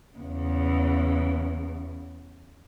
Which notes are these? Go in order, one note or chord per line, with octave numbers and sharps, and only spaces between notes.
E2 C#3